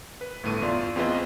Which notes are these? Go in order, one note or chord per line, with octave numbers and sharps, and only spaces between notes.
B4
G1 A2 A3 D#7
E2 F4 D5 C6
E2 C4 F4 G#4 B4 D#5